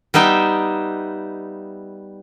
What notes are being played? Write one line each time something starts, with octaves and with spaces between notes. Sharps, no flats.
G3 B3 D#4 E5 G5